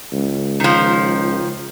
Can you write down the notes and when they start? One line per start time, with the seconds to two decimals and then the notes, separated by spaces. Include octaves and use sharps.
0.12 C#2
0.60 D#3 F3